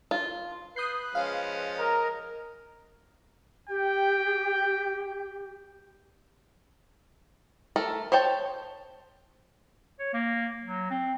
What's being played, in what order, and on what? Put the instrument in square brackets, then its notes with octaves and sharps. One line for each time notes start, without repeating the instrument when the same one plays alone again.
[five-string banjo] F4
[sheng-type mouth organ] B4 F#6 [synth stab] D#6 G6 C7
[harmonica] F3 G#3 C#4 [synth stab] F5
[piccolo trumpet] A#4 [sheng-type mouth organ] D#5 A#5
[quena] G4 [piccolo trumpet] G5
[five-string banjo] A3 A4 A#4
C5 C#5 G5 A5
[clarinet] C#5
A#3
F#3
C4